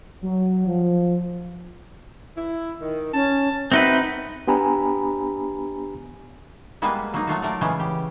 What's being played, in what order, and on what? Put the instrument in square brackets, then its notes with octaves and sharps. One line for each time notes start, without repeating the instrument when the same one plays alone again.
[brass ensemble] F#3
F3
[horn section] E4
D#3
[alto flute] C#4 [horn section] A5
[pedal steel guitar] C4 D#4 B4 [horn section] F#4 A#4 F#5 [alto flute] E5
[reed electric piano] B3 D4 G4 G#5 A#5 B5
[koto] G3 G#3 A#3 B3 B4
F#3 A#3 D#4
F#3 A3 F4 F#4
A3 A#4 D5
C#3 E3 G#3 B3 C#4
G4